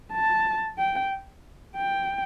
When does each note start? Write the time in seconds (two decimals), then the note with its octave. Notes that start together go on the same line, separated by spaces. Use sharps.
0.13 A5
0.78 G5
1.76 G5